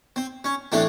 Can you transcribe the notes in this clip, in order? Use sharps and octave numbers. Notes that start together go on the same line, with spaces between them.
C4
C#4
A2 E3 A3 C4 D4